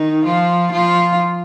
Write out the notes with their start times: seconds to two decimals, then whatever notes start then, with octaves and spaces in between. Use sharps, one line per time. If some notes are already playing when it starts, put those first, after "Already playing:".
Already playing: D#3 D#4
0.25 F3 F4
0.72 F3 F4